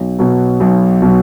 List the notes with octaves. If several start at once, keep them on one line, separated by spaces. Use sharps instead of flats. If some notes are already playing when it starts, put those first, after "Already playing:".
Already playing: B1
B2 F#3
B1
B2 F#3